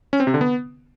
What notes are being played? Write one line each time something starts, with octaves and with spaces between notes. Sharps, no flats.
C#4
C4
C3
D3
B3